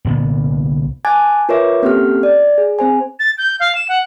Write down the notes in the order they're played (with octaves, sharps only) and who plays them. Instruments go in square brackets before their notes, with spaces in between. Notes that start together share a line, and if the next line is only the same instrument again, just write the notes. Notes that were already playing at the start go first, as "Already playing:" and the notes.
[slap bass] C2 A#2 D3 B3
[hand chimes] G#5 A5 D6 F#6 G#6 A6
F4 A#4 B4 C#5 E5 D6
A#3 C4 C#4 G4 A4 F6
D5
G#4
C4 C5 G#5
[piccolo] A6
G6
F5
E7
F#5